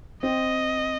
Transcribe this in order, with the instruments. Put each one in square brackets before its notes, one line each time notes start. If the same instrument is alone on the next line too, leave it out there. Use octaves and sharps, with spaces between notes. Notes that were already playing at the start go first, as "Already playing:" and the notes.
[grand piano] C4 [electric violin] D#5